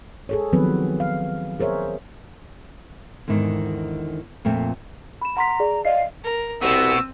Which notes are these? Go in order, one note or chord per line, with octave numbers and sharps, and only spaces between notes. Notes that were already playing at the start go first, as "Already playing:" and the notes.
G#4 A4 C#5
D#3 F3 F#3 B3 C4 B4
F5
G#4 A#4 C5 C#5 E5
E2 G#2 D3 D#3
F2 A#2 A3 C4
B5 E7
F#5 A#5 C6 B6
G#4 D5
D5 D#5 F5 C7
A#4
C2 B2 B3 C4 E6